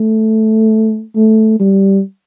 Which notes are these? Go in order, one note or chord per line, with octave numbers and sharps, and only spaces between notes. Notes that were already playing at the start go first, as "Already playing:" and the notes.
Already playing: A3
A3
G3